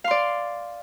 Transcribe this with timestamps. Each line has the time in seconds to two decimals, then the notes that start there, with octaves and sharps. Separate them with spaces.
0.04 F5
0.08 C6
0.11 D5